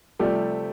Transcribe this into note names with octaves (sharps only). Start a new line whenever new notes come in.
C3 F3 G3 A3 G4